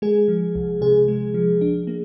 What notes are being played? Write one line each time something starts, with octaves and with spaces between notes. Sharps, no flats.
G#3 G#4
F3
C2
C3 G#4
G#3
F3
D4
A#3